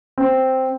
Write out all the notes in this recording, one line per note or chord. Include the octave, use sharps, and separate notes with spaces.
C4